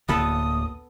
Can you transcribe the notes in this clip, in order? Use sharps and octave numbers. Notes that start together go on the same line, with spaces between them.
D1 D2 D3 A#3 B3 A4 B4 D#6